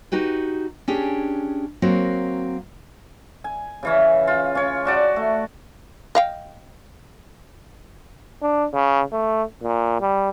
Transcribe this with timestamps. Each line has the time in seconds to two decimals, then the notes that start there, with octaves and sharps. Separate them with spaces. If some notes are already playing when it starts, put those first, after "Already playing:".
0.12 D#4 F#4 G4 B4
0.88 C#4 D4 G4 G#4
1.82 F#3 A#3 C4 F#4 A#4
3.44 G#5
3.83 C#3 E3 C#4
4.27 F4
4.55 C#4 C#5
4.85 D4 F#4 D5
5.16 A3
6.15 D#5 F5 G5
8.42 D4
8.73 C#3
9.12 A3
9.63 A#2
10.01 G3